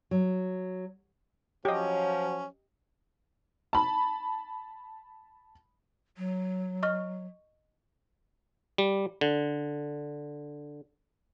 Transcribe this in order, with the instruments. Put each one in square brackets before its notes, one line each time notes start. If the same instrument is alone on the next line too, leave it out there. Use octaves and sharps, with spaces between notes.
[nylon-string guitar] F#3
[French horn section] F3 [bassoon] F#3 [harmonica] C#4 [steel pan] G4 D#5
[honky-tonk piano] A5 B5
[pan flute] F#3
[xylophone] D#5 C#6 F6
[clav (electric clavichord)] G3
D3